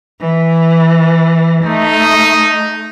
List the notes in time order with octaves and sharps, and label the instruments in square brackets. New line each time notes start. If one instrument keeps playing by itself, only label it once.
[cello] E3
[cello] A3 [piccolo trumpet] D#4